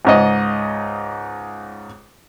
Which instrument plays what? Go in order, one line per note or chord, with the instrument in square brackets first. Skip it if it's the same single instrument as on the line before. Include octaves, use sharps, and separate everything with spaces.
[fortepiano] C#2 G#2 D#5